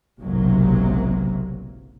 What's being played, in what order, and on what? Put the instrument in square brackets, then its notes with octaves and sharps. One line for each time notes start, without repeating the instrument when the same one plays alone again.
[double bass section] F#1 B1 G#2 C3 F#3 A#3